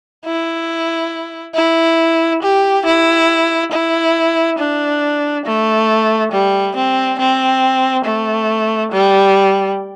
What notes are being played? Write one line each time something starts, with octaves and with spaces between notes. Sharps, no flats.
E4
E4
G4
E4
E4
D4
A3
G3
C4
C4
A3
G3